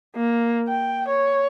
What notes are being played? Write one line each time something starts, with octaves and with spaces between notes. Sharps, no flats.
A#3
G5
C#5